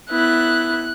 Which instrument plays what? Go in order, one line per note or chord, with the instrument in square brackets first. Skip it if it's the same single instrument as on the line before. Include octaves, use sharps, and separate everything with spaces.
[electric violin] B3 E4 [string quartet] F#6